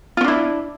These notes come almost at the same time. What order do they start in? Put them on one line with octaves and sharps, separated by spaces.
F4 C#4 D4 E4